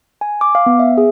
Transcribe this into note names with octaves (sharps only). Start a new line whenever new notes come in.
G#5
D6
F5
B3
E5
G#4